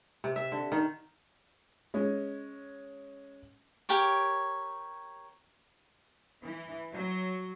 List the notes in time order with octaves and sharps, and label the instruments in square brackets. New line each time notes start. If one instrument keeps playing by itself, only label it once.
[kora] C3
E5
D3
D#3
[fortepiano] G#3 C#4
[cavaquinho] G4 A#4 C#5
[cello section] E3
F#3